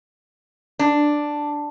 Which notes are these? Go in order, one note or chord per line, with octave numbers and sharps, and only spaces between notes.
D4